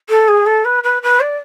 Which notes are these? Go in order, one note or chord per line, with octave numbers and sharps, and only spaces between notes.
A4
G#4
A4
B4
B4
B4
D5